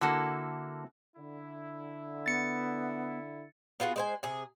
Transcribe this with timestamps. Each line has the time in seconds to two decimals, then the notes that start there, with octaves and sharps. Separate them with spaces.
0.01 D3 A#3 E4 F#4 A4
1.17 D3 E4
2.26 B3 A6 C#7
3.80 B3 F4 F#4 G#4
3.96 G#3 C5 G#5
4.23 C3 G#4